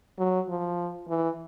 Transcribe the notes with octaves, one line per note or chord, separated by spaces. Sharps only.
F#3
F3
E3